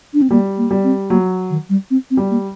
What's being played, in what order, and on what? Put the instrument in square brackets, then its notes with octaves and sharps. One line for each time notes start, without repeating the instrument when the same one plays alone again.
[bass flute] D4
C4
[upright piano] G3 [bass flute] A#3
[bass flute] A#3
[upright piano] G3
[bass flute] C4
[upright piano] F#3 [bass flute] A#3
[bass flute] D#3
G3
C4
C4
[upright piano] G3
[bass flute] A#3